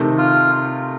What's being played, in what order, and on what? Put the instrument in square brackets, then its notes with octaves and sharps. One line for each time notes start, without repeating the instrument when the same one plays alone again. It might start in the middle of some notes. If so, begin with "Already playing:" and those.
Already playing: [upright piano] C3 D#3 A3
[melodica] F4